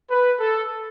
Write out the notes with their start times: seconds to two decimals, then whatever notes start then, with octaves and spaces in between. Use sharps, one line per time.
0.10 B4
0.40 A4